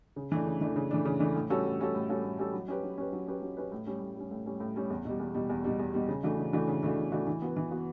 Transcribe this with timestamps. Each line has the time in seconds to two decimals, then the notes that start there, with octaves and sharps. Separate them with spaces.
0.16 C#3
0.32 E3 A3 D4
0.46 C#3
0.61 E3 A3 D4
0.76 C#3
0.91 E3 A3 D4
1.05 C#3
1.20 E3 A3 D4
1.35 A2
1.50 G3 C#4 F#4 A4
1.65 A2
1.79 G3 C#4 F#4 A4
1.95 A2
2.09 G3 C#4 F#4 A4
2.24 A2
2.39 G3 C#4 F#4 A4
2.54 F#3
2.68 C#4 G4 B4
2.83 F#3
2.98 C#4 G4 B4
3.13 F#3
3.28 C#4 G4 B4
3.42 F#3
3.57 C#4 G4 B4
3.72 A2
3.87 G3 C#4
4.02 A2
4.16 G3 C#4
4.31 A2
4.46 G3 C#4
4.60 A2
4.76 G3 C#4
4.90 E2
5.05 B2 G3
5.20 E2
5.34 B2 G3
5.50 E2
5.64 B2 G3
5.79 E2
5.94 B2 G3
6.08 C#3
6.23 E3 A3 D4 F#4
6.39 C#3
6.53 E3 A3 D4 F#4
6.68 C#3
6.83 E3 A3 D4 F#4
6.98 C#3
7.12 E3 A3 D4 F#4
7.27 E3
7.42 B3 F#4 B4
7.57 E3
7.71 B3 F#4 B4